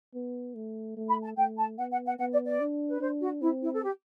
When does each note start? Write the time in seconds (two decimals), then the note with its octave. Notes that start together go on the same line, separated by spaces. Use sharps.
0.15 B3
0.55 A3
0.97 A3
1.09 B5
1.23 A5
1.37 A3 G5
1.58 A5
1.78 B3 F#5
1.92 F#5
2.06 F#5
2.19 B3 F#5
2.33 D5
2.46 D5
2.60 D4
2.89 B4
3.00 D4 C5
3.22 F#4
3.41 C4 E4
3.62 E4
3.74 A4
3.83 G4